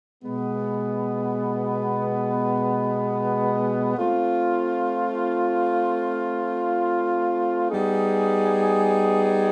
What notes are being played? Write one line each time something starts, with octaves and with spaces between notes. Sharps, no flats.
B2 G#3 B3
A3 C4 F4
G3 B3 D#4 G#4